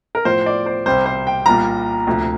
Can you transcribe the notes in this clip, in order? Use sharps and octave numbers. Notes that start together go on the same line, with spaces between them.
A#4
A2 F3 C5
D5
C5
C2 C3 G3 C5
C5
G5
C2 A#2 G3 A#5
D2 C3 F3